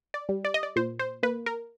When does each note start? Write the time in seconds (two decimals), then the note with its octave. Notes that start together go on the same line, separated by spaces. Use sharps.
0.14 D5
0.29 G3
0.45 D5
0.54 D#5
0.63 D5
0.76 A#2 C5
0.99 C5
1.23 A#3 B4
1.46 A#4